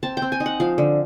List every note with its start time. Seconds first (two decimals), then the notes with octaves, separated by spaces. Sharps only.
0.03 C4 A5
0.17 C4 G5
0.32 G#5
0.40 D#4
0.46 F#5
0.60 F3 F5
0.78 D3